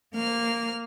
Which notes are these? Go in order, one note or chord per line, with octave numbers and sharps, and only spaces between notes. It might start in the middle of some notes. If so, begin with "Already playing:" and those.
A#3 F6